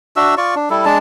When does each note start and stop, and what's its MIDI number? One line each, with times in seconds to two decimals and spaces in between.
0.16 0.35 62
0.16 0.35 66
0.16 0.35 76
0.16 0.35 88
0.37 0.55 65
0.37 0.55 74
0.37 0.55 85
0.55 0.69 62
0.70 0.85 55
0.70 0.85 64
0.70 0.85 69
0.85 0.98 56
0.85 0.98 62
0.85 0.98 81